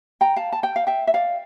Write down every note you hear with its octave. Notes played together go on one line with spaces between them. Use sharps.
G5 A#5
F5 A5
A5
G5
F5
E5 G5
E5
D5 F5